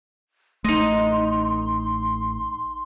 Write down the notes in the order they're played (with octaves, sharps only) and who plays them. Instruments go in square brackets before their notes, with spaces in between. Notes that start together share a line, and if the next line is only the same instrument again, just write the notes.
[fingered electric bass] A1 A3 [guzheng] D#4 D#5 [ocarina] C6